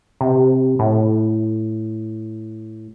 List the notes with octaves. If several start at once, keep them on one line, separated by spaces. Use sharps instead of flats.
C3
A2